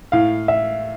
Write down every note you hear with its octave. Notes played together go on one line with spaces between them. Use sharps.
A2 F5
E5